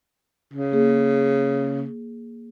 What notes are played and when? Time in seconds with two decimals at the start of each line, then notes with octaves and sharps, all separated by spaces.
0.54 C#3
0.72 A#3 G#4